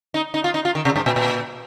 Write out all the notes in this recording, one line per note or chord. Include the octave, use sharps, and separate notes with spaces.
D#4
D#4
F4
D#4
F4
D#3
C3
G2
A#2
A#2